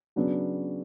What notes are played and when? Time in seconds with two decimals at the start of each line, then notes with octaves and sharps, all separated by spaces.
0.16 C#3 F#3 B3 D4